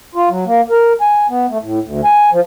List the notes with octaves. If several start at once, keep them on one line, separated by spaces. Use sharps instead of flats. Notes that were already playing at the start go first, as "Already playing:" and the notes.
F4
F#3
A#3
A#4
G#5
B3
A3
A2
D2
G#5
F3